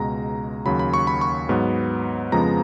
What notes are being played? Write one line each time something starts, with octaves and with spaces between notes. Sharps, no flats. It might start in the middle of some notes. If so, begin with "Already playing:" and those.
Already playing: C#2 B2 G#3 A#5
D#2 C#3 F#3 B5
B5
C#6
B5
C#6
G#2 F#3 B3
F2 C#3 F3 G#3 B3 A#5